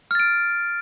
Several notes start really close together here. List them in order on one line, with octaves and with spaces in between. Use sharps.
F6 A6 D7